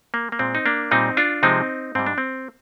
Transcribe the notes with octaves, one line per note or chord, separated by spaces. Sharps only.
A#3
A#3
A#2 G#3 C4
D#4
A#3 D4
A#2 G3 C4 D#4
D4 F4
C3 F3 G#3 C4 D#4
G#2 G3 C4
D4
C4